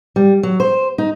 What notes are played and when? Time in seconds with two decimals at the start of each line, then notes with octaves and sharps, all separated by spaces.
0.16 G3
0.43 F#3
0.60 C5
0.98 D#4